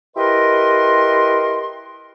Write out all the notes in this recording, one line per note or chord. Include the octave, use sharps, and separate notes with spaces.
E4 G4 A#4 B4 D#5 C6